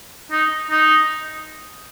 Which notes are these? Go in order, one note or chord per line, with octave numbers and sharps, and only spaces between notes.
D#4
D#4